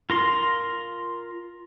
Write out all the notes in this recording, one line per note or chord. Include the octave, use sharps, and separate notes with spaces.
F4 A#4 C6